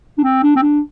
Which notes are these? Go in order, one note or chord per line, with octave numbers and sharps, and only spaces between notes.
D4
C4
D4
C4
D4